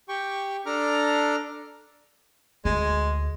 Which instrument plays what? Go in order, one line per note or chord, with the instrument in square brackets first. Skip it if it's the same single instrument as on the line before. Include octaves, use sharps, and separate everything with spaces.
[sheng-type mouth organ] G4 G5 C#6
D4 A4 A#5 D6 F6
[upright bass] D2 [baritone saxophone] G#3